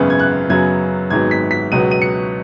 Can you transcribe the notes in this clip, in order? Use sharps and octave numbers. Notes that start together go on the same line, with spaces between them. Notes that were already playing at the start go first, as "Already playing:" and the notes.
Already playing: G#1 F#2 C#3 B3
G#6
F#6
F#2 C#3 F#3 B3 G#6
G#1 G#2 F#3 B3 G#6
B6
B6
C#2 B2 F#3 B3 D#7
D#7
C#7